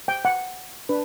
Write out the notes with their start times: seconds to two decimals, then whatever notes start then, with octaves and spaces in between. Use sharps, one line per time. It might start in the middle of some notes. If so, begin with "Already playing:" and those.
0.08 G5
0.25 F#5
0.89 D4 B4